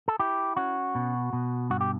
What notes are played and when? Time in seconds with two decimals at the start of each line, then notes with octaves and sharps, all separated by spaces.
0.08 A4
0.19 E4 G4
0.57 C#4 F#4
0.95 B2
1.33 B2
1.70 G2 F#4
1.81 G4